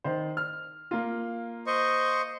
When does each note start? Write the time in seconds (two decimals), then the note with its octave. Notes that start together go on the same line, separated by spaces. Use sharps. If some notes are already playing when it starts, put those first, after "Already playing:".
0.04 D#3 C5
0.37 F6
0.91 A#3 F4
1.67 C5 D#5 C#6